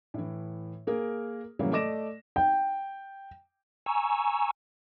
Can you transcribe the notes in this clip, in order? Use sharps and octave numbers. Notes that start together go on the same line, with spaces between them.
A2 E3
A#3 G#4 A#4
A2 C#3 E3 F#3 G3 A#3
A3 D5 D#5 D6 A#6 E7
G5
G#5 A#5 C#6 E6